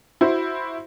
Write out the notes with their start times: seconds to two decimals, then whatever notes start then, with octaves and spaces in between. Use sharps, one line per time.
0.21 E4 F#4 C5